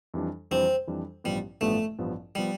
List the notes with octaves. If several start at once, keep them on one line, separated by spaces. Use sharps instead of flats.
F2 E3 G3 D4
F2 E3 G3 C4 D4
F2 E3 G3 D4
A1 G2 F3 G3 B3
A1 G2 F3 A3 B3
A1 G2 F3 B3
F3 G3 B3